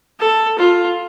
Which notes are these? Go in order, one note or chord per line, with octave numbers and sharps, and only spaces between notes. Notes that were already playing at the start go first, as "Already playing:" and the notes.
A4
F4